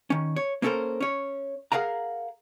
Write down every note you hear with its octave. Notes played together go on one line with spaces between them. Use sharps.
D#3 C#4
C#5
A#3 B3 C#4 A4 A#4 C5
C#4 C#5
G#4 A#4 F5 F#5 A#5